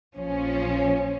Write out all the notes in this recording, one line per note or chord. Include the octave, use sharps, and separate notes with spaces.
A#1 F3 C#4